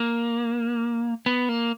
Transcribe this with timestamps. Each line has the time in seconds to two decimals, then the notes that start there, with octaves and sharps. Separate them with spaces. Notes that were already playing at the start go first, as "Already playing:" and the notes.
Already playing: A#3
1.26 B3
1.49 A#3